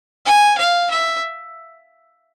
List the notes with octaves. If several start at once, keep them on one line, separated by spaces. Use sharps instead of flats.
G#5
F5
E5